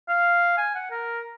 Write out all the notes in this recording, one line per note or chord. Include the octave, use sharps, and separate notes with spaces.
F5
G#5
F#5
A#4